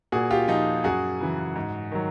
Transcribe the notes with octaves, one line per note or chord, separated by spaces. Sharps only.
A#2 F#4 G#4
F4 G4
F3 D#4 F4
F#2 F#4 G#4
C#3 E3
G#2
D#3 F#3